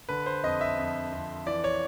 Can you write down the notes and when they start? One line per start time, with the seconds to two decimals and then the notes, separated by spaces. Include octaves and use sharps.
0.09 D3 B4
0.26 C5
0.43 F2 D#5
0.61 E5
0.77 F2
1.12 F2
1.46 E3 D5
1.64 C#5